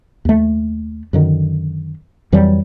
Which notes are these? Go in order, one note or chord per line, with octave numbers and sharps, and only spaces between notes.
D#2 A3
F#2 D3 D#3
F2 E3 F#3 G3